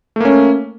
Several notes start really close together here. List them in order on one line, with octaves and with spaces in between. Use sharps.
A3 A#3 C#4